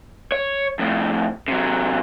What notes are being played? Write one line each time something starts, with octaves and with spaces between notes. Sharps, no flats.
C#5
F2 A2
C3 F#3